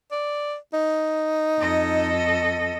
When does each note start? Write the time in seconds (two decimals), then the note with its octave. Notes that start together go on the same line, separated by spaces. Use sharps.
0.12 D5
0.73 D#4
1.58 F2 A4 D#5